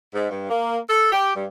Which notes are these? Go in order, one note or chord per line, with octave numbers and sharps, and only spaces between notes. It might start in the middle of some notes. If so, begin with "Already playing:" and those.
G#2
G2
A#3
A4
G4
G2